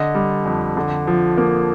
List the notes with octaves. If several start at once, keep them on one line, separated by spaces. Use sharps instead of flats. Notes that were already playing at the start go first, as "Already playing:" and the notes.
Already playing: D3 D#5
G3
F2
D3
F3
A#3